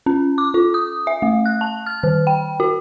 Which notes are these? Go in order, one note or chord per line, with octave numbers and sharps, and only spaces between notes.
C#4
D6
F4
D#6
E5
A3
F#6
A5
F6
D#3
G5
F#4